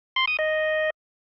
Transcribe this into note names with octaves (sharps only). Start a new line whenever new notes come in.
C6
D#6
D#5